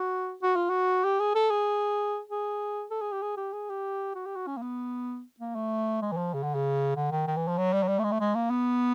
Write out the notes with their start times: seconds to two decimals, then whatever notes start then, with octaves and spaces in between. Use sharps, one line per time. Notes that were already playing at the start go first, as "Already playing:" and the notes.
Already playing: F#4
0.42 F#4
0.56 F4
0.70 F#4
1.04 G4
1.20 G#4
1.35 A4
1.51 G#4
2.29 G#4
2.91 A4
3.02 G#4
3.12 G4
3.22 G#4
3.37 G4
3.53 G#4
3.70 G4
4.15 F#4
4.26 G4
4.36 F#4
4.47 C#4
4.57 A#3
4.62 B3
5.40 A#3
5.55 A3
6.02 G#3
6.12 E3
6.17 F3
6.34 C#3
6.43 D3
6.55 C#3
6.96 D3
7.11 D#3
7.27 D#3
7.36 E3
7.48 F3
7.57 F#3
7.73 G3
7.83 F#3
7.88 G3
7.99 A3
8.04 G#3
8.12 A3
8.20 G#3
8.35 A#3
8.50 B3